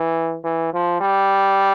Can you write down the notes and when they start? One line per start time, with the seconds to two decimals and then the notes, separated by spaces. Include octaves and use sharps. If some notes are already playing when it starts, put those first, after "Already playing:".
Already playing: E3
0.44 E3
0.73 F3
1.01 G3